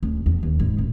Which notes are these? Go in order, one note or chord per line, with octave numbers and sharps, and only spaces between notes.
D2
E2
D#2
G#2
D1